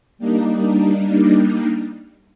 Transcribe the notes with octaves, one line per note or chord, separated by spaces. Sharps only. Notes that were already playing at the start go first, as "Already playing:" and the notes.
G3 A#3 D4 D#4